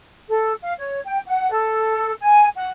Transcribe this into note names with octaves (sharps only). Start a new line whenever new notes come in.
A4
F5
C#5
G5
F#5
A4
G#5
F#5